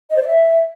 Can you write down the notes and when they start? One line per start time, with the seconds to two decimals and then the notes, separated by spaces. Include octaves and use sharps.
0.11 D#5
0.16 C5
0.21 D5
0.26 E5